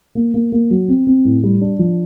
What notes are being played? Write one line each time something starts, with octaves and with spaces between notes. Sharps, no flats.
A#3
A#3
A#3
F#3
C4
C4
A2
G3
D4
F3